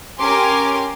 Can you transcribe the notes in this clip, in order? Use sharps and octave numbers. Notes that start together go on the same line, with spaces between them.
C#4 G4 A#4 G#5 C6 D6